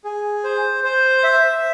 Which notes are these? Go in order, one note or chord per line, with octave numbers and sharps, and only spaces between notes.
G#4
C5
C5
E5